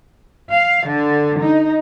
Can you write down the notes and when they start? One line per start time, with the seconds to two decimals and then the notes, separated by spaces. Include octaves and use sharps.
0.52 F5
0.87 D3
1.42 D#4